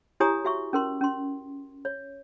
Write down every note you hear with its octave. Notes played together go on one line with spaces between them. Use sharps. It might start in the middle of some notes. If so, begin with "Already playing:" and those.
E4 G4 C#5 G#5 A#5 D#6
F#4 E5 C#6
C#4 A#4 C6
C#4 C6
C#5